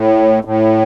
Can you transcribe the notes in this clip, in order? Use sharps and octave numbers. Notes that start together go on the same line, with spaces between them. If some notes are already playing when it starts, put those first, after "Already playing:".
Already playing: A2
A2